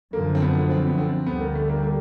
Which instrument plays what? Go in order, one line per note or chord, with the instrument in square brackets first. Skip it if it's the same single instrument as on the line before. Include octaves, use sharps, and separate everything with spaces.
[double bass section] F#2 D3 F3 [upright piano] A#3
[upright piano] C4
B3
C4
B3
C4
[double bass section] D2 D3 G3 [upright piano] B3
[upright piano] A#3
A3
A#3
A#3